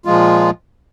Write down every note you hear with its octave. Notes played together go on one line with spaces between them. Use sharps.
A#2 F3 G#3 F4